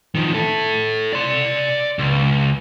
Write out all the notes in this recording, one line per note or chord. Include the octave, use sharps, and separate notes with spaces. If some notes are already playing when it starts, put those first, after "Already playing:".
D#3 F3
E4 A4
D5 C6
C#2